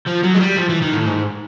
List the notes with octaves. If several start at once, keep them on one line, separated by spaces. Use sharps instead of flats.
F3
F#3
G#3
G3
F3
E3
D#3
A2
G#2